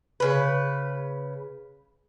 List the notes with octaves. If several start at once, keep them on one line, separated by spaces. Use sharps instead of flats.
C#3 B4